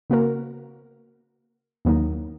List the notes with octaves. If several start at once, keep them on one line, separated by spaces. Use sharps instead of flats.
C#3 A#3 F#4 A#4
D#2 D#3 F#3 A#3 D#4